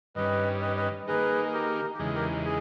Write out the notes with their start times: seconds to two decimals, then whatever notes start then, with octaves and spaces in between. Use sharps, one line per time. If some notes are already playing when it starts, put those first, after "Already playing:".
0.15 G2 D#3 G3 C#4 B4 D#5
0.61 B4 D#5
0.76 B4 D#5
1.07 D#3 A#3 D#4 G#4 B4
1.45 G#4
1.53 G4 A#4
1.93 G4
1.99 E2 C#3 E3 G#3 D#4 G#4
2.14 G4 A#4
2.45 G#4